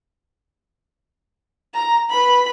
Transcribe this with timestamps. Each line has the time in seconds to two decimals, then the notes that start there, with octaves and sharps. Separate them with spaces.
1.74 A#5
2.11 B4 B5